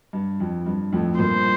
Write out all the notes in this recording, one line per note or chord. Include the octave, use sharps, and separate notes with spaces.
G2
F2
G2
F2 A2
G2 A#2 C5